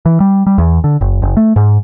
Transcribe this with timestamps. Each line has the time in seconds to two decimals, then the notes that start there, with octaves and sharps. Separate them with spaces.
0.06 E3
0.20 G3
0.47 G3
0.58 E2
0.84 D3
1.01 F#1
1.22 F#1
1.37 A3
1.56 G#2